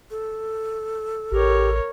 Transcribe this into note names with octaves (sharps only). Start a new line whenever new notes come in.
A4
A1 G4 A#4 C#5